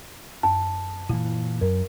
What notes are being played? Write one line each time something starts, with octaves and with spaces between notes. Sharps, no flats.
F#2 A5
A#2 E3 E4
F#2 A#4